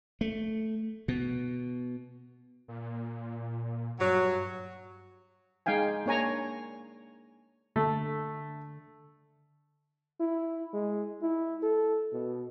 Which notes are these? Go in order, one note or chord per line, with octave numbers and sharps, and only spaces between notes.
A3
B2
A#2
G2 F#3
G#3 D#4 F5 G5 G#5
A#3 D4 C#5 G#5 A#5
D3 A3
E4
G#3
E4
A4
B2